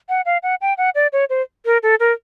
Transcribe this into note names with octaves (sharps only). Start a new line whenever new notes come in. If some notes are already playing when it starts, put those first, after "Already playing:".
F#5
F5
F#5
G5
F#5
D5
C#5
C5
A#4
A4
A#4